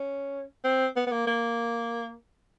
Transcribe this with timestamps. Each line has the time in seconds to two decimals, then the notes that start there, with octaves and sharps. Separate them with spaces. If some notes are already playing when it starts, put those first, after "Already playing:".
Already playing: C#4
0.64 C4
0.96 B3
1.07 B3
1.12 A#3
1.27 A#3